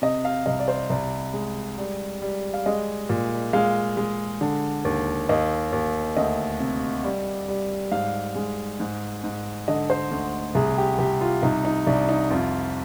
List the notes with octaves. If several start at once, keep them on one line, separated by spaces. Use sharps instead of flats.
C3 D#5
F5
C2 D#5
D5
C5
C2 D5
G#3
G3
G3
F5
G#3 D#5
A#2
G#3 F5
G#3
D3
D#2
D#2 D#5
D#2
D2 D#5
C3
G3
G3
G#2 F5
G#3
G#2
G#2
D3 D#5
C5
D2
C2 G#4
G4
C2 G4
F4
C2 D#4
D#4
C2 D4
D#4
F2 F4